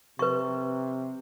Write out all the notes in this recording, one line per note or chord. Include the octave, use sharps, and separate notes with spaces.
C3 B4 C#6